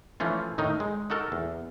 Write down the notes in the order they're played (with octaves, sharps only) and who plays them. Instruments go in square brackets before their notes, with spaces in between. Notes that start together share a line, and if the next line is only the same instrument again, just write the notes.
[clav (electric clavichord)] E3 F3 A3 C#4 F4
A2 D#3 D#4
G#3
D#4 F#4 A4 A#4
E2